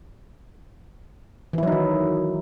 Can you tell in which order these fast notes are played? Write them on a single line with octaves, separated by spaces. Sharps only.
E3 E4 F#3 D#4 D#3